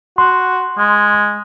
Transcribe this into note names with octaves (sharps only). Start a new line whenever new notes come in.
F#4 C6
G#3